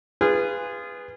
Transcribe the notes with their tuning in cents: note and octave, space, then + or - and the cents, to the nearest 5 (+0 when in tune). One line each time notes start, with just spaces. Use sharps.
F4 -20 G#4 -20 B4 +0